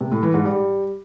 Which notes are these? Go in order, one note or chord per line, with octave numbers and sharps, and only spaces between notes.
C3
A2
E3
G#2
G3